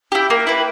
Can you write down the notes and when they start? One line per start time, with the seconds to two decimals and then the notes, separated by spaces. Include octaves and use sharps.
0.12 E4 G4
0.30 A#3 G5
0.47 E4 B4